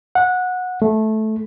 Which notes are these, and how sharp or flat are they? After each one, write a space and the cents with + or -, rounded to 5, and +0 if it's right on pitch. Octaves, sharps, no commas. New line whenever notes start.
F#5 -20
A3 -15